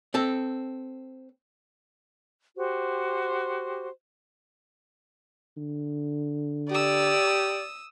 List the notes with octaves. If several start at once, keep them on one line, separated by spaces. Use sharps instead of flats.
C4 A4
F#4 G4 C5
D3
G4 D5 D#6 E6